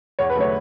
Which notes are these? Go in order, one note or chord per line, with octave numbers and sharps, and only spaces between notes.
E2 C#5
B4
D3 F#3 A3 C#5